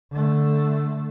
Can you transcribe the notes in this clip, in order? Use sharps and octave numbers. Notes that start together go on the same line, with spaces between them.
D3 A3